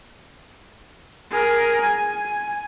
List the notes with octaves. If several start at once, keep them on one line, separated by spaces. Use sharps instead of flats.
G#4 A#4
G#5